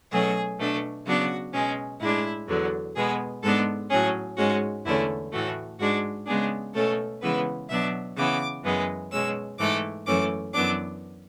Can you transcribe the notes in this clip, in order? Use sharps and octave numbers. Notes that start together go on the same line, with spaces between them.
B2 F#3 A3 C#4 G#4
B2 A3 D4
C#3 F#3 B3 D4 F#4
B2 G#3 C#4
A2 G#3 D4 E4
E2 D3 F#3
B2 G#3 B3 G#4
G#2 G#3 B3 D4 A4
A2 F#3 C#4 G#4
G#2 G#3 C#4 F#4
E2 D3 A3 C#4 E4
A2 E3 A3 F#4
G#2 G#3 D4 F#4
C#3 G#3 B3 D4 G#4
B2 A3 C#4 A4
C#3 E3 G#3 B3 B4
B2 F#3 B3 D4 E5
C#3 E3 B3 D6
F#2 E3 G#3 B3
B2 G#3 C#4 E6
G#2 E3 A3 D6
F#2 E3 A3 C#4 D6
F#2 E3 B3 D4 D6